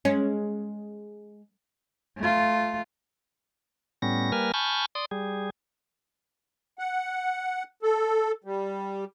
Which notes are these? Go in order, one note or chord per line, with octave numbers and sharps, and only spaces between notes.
G#3 C#4
A3 F4
A2 G3 B3 C#4 A#6
G3 A#3 A#4 B4 G#5 F6
G#5 A5 B5 C#6 F6 G6
D5 C6 D#6
G3 G#4
F#5
A4
G3